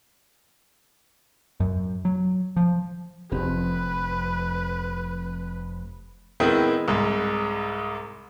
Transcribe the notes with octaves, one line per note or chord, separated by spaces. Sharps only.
F#2
F#3
F3
F1 F2 C3 C4 B4
D#3 G#3 B3 C4 E4
C2 G#2